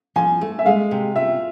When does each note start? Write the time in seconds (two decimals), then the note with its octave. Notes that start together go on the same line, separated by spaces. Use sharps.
0.16 F3 G#5
0.41 A3
0.59 E5
0.66 G#3 F5
0.91 C3
1.16 F4 E5